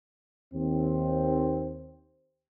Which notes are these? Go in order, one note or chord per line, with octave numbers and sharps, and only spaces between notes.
D#2 C4